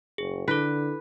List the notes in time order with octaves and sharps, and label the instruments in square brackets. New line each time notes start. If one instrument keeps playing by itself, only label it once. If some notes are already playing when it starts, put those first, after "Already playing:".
[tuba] F#1 [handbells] G#4
[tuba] D3 [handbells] E4 A4 [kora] B4